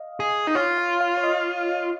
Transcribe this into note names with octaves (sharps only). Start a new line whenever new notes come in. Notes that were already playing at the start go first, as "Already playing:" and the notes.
Already playing: D#5 F5
G#4
D#4
F4 C#5
F5
F5
C#5
D#5